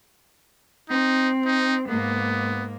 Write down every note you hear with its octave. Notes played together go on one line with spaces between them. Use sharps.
C4 D#4
D#4
G#2 A#3 B3